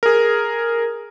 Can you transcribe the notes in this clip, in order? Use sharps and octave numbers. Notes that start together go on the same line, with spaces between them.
G#4 A#4